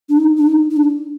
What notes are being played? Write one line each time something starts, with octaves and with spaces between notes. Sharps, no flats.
D4
D#4
D4
D#4
D#4
D4